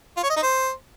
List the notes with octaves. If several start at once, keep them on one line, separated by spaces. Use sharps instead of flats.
F4
C#5
D#5
D#4
C5